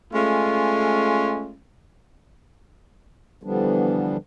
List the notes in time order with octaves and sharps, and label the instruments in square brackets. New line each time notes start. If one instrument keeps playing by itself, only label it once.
[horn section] G#3 A3 C#4 F4
[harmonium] D3 E3 F3 G3 B3 D4